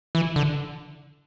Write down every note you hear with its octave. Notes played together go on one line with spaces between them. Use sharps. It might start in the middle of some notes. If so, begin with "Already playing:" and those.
E3
D3